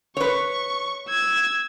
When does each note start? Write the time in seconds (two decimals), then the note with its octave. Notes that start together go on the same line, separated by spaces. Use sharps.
0.17 B4 C#5 C#6
1.09 E6 G#6